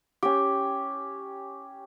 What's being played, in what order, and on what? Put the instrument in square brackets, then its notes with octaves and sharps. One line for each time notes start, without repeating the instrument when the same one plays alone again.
[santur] C#4 G4 [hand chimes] D6